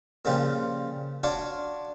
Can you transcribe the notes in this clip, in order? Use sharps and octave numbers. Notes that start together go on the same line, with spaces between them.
A#2 C#3 F3 G3 F4
D4 F4 F#4 C#5 D5